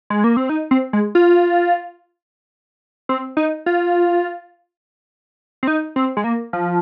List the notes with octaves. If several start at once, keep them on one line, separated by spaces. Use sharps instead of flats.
G#3
A#3
C4
D#4
C4
G#3
F4
C4
D#4
F4
C4
D#4
C4
G#3
A#3
F3